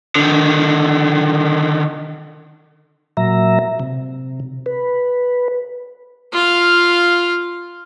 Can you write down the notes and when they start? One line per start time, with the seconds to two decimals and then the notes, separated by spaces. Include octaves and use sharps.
0.16 D3 D#3
3.17 A#2 F#3 E5 A#5
3.80 C3
4.66 B4
6.32 F4 F5